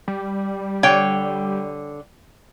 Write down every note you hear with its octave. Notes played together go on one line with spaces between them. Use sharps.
G3
D3 C#5 G5